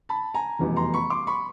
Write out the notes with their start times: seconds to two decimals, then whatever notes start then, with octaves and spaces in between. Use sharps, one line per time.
0.09 A5 B5
0.34 G#5 A#5
0.59 F1 E2 B2 G3
0.76 A#5 C6
0.94 B5 C#6
1.10 C6 D6
1.27 B5 C#6